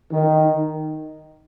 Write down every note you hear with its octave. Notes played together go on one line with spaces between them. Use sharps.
D#3